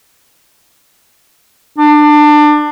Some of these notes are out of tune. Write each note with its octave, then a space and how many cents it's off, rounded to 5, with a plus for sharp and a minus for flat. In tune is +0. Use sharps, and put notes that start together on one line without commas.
D4 +25